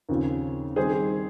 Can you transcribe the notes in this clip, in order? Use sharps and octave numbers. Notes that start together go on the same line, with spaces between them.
D#2 C#3 F3 C4
D#3 G3 C4 G#4 C5